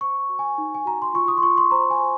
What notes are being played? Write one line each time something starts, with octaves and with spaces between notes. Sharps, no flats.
C5 C#6
F#4
G#5
D#4
G#5
F#4 A#5
C6
F4 C#6
D#6
C6
F4 C#6
C6
C5 A#5
G#5
C5